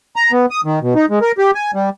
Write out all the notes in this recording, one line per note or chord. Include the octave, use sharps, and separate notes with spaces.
A#5
B3
D#6
D#3
B2
D#4
G#3
A#4
G4
G#5
G3